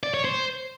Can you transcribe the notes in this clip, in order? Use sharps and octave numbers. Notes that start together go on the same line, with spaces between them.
D5
C#5
C5